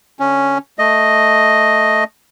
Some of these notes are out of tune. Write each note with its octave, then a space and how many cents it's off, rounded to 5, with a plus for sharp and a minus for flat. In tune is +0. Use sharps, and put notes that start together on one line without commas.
D3 -10 C#4 +0
A3 +0 D#5 +0